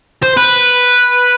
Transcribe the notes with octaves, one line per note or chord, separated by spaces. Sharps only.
C5
B4